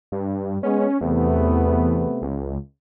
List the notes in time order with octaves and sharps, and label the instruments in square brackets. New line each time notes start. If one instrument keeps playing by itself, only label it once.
[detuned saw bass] G2
[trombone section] G#3 B3 [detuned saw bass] C#4
[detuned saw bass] E2 [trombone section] C3 A3 B3
[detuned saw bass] C#2